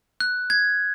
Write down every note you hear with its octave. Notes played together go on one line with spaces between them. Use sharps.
F#6
G#6